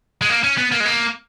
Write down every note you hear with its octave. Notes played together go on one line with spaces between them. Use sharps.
G#3
A#3
C#4
B3
A#3
G#3
A#3